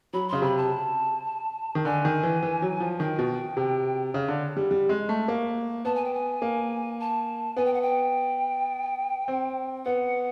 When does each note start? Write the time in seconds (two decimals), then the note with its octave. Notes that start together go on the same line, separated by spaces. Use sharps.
0.13 F#3 B5
0.28 C#3 C6
0.42 C3 B5
0.57 A5
1.75 D#3
1.85 D3 G#5
2.05 D#3
2.23 E3
2.42 E3
2.62 F#3
2.80 F3
3.00 D#3 G5
3.19 B2
3.57 C3
4.14 C#3
4.28 D3
4.56 G3
4.71 G3
4.89 G#3
5.09 A3
5.28 A#3
5.85 B3 A5
5.95 G#5
6.04 G5
6.14 G#5
6.42 A#3
7.00 A5
7.56 B3 G#5
7.65 G5
7.73 F#5
7.81 G5
9.28 C4
9.85 B3 F#5